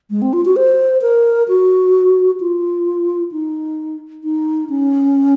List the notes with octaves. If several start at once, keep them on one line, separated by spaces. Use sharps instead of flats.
G#3
C4
F4
F#4
C5
A#4
F#4
F4
D#4
D#4
C#4